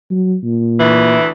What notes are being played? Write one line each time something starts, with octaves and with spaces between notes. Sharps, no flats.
F#3
A#2
D2 E3